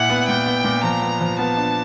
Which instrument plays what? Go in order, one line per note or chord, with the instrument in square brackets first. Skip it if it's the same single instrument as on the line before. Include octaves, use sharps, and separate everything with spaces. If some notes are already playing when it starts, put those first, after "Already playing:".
Already playing: [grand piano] A#2 E4 [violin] F#5
[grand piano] B3
[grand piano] A#2 [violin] G5
[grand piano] B3
A#2
[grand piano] F3 [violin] A#5
[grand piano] B3
F3
[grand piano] B3 [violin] A5
[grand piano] D4